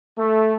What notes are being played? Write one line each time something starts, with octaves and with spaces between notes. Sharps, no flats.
A3